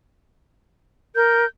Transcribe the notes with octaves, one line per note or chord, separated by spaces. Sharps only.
A#4 G6